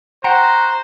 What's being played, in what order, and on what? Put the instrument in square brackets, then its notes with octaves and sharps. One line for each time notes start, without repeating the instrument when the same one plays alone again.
[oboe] F#4 [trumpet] C5 [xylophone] F#5 G5 [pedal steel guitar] A#5